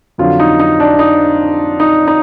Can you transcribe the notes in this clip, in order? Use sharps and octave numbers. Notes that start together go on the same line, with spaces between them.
F2 D3 F#3 F4
D#4
D#4
D4
D#4
D#4
D#4